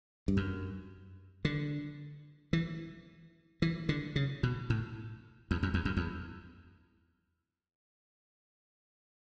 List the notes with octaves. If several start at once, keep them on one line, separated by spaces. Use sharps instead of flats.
G2
F#2
D3
E3
E3
D3
C#3
B2
A2
E2
F#2
E2
F#2
E2